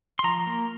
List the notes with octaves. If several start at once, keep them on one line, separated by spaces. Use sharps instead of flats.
C6
F3 A#5
A#3